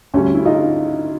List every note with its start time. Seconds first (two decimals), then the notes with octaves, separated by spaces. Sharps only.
0.14 D2 D3 G3 C#4
0.34 E4
0.45 D#4 F4